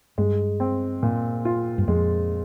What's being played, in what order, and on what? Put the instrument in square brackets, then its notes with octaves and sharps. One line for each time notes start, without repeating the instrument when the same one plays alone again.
[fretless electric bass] G2 [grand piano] G#3
[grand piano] C4
A#2
F4
[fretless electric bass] G2
[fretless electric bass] F2 [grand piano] G#3